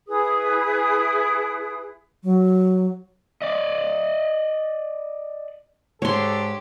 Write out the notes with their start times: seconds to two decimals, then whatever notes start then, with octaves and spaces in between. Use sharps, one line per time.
0.08 E4 G#4 B4 D#6
2.24 F#3
3.42 D5 D#5
6.02 G#2 D4 G4 A4 C#5 C6